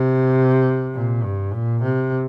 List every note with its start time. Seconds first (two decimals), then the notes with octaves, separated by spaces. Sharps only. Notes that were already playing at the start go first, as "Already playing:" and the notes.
Already playing: C3
0.95 A#2
1.23 G2
1.53 A#2
1.83 C3